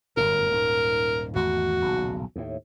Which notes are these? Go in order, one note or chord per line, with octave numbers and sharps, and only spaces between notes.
G1 F#2 A2 A#4
D#1 G#2
G#1 E2 A3 F#4
D#1 B1 C#3
D#2 A2